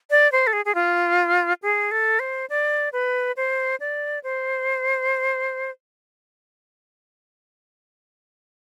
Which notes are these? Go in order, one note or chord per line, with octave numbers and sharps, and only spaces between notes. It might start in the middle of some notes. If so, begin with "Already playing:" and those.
D5
C5
A4
G#4
G#4
F4
G#4
A4
C5
D5
B4
C5
D5
C5